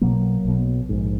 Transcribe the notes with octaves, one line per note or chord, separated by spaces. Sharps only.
B1 B2 F#3 A#3
B1 B2
A#1 G#2